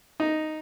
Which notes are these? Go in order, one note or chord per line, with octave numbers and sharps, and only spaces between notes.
D#4